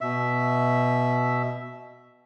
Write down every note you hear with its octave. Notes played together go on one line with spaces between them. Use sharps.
B2 E5